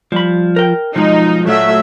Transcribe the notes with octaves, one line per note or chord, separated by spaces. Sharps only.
F3 G3 B5
A#4 G5
B1 F3 G#3 D#4
A#2 F#3 A3 F4 A4 E5